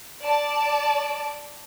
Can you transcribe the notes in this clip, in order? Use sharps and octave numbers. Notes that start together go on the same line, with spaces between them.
D5 A5